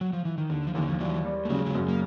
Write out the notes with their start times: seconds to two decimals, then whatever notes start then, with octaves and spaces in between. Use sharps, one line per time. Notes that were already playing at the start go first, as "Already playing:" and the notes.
0.01 F#3
0.13 F3
0.25 E3
0.38 D#3
0.49 D#2 D3
0.67 F3
0.74 D#2 D3 E3
0.89 F3
1.00 E3 F#3 G3
1.25 G3
1.45 A3
1.50 C#3 F#3 G#3
1.66 F#3 G#3
1.75 F#2
1.89 A#3